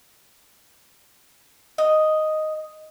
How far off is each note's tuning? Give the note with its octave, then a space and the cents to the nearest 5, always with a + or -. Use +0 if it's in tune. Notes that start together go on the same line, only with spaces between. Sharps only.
D#5 +0